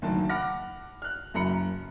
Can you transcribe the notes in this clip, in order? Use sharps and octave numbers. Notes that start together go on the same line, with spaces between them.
F#1 D2 D#3 F#3 A5
F#5 B5 D6 F6 A#6
F6 F#6
F#1 F#2 A#5 B5 C#7